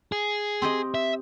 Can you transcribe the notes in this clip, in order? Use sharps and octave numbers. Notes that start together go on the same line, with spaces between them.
G#4
C4 G4 D#5
E5